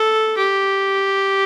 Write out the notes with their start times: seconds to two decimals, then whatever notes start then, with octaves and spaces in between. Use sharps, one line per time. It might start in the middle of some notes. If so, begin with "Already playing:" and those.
Already playing: A4
0.37 G4